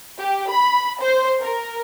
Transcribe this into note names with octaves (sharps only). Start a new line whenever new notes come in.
G4
B5
C5
A#4